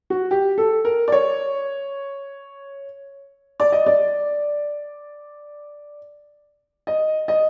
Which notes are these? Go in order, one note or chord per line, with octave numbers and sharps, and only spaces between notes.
F#4
G4
A4
A#4
D5
C#5
D5
D#5
D5
D#5
D#5